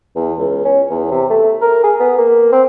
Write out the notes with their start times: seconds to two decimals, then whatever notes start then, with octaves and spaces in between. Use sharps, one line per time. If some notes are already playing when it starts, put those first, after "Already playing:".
0.16 E2
0.39 C#2
0.65 C#4
0.91 E2
1.11 C3
1.30 A3
1.62 A#4
1.84 G#4
2.00 B3
2.18 A#3
2.52 C4